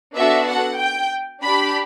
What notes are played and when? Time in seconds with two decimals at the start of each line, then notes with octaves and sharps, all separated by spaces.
0.15 B3 D4 F#4 A4 E5
0.47 F#5
0.79 G5
1.42 D4 G4 B5